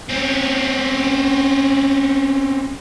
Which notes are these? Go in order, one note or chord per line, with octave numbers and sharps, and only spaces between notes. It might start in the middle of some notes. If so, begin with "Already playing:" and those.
C4 C#4